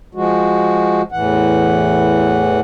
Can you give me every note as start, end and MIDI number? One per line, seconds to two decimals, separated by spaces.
0.15 1.02 53
0.15 1.02 56
0.15 1.02 66
1.12 2.60 40
1.12 2.60 45
1.12 2.60 52
1.12 2.60 78